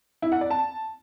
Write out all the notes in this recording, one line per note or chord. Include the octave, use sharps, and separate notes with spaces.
E4
F#5
D5
A5